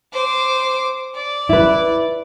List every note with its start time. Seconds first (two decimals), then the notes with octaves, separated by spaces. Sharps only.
0.12 C5 D6
1.15 D5
1.49 E4 B4